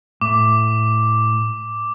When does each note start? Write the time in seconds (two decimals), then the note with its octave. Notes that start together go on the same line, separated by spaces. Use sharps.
0.21 A2 D6